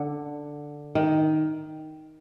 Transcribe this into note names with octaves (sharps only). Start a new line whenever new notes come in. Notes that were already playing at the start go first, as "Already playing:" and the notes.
Already playing: D3
D#3